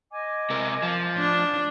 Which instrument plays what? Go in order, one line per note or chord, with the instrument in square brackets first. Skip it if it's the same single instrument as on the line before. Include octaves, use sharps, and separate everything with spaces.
[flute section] D#5 G#5 D6
[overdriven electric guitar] C3 A#4
F3
[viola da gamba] D4